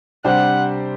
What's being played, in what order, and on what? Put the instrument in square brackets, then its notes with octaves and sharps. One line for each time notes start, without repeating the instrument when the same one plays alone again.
[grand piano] C3 G3 D4 G4 C5 [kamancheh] F#5